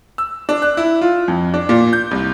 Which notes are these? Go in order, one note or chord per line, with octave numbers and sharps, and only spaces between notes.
E6
D4
F#6
E4
F4
F2
D4
A#2
G6
C2